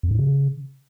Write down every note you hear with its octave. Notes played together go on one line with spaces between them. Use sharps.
F2
G#2
C#3